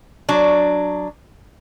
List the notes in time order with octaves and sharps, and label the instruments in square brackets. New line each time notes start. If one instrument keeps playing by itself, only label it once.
[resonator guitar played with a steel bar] F#3 D4